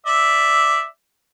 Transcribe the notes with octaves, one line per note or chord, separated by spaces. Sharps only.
D5 E5